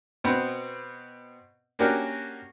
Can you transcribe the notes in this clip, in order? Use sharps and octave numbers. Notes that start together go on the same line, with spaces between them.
B2 B3 C4
A#3 C#4 D4 F#4 G4 A#4